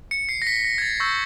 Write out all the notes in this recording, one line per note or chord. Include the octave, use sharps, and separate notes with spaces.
C#7
C7
A#6
B6
A#6
G#6
A6
C#6 E6 G6 A#6